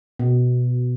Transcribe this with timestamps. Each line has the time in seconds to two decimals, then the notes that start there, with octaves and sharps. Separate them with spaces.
0.19 B2